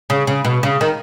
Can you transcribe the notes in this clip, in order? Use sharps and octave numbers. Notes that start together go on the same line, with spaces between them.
C#3
C#3
B2
C#3
D#3